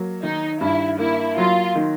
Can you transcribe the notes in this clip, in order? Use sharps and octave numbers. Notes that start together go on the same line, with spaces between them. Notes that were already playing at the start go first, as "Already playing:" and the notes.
Already playing: F#3 A#3
D#3 D#4
G2 E4
A#3 E4
F#3 F4
D#3